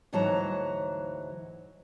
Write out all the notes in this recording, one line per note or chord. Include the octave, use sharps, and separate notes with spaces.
D2 G#2 E3 F#3 A5 A#5